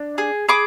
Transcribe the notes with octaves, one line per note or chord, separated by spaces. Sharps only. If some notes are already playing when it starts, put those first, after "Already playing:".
Already playing: D4
G#4
G#4 B5 D6